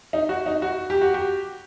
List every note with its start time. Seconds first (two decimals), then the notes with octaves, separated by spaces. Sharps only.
0.13 D#4
0.29 F#4
0.46 D#4
0.62 F#4
0.90 G4
1.02 F#4
1.14 G4